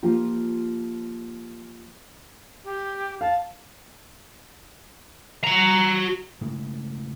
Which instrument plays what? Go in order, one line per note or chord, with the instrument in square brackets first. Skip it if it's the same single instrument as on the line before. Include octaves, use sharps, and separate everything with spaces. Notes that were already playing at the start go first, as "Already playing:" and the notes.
[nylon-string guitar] F3 A#3 F4 G4
[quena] G4
[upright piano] F5 [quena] A5
[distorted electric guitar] F#4 A#5
[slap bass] A2 C#3 G#3